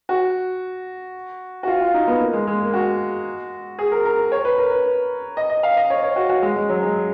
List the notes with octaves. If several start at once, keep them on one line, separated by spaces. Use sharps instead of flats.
F#4
F#4
F4
F4
D#4
B3
A#3
G#3
G#3
A#3
F#4
G#4
A#4
A#4
C#5
B4
A#4
B4
D#5
D#5
F5
D#5
C#5
C#5
F#4
F#4
G#3
G#3
F#3
G#3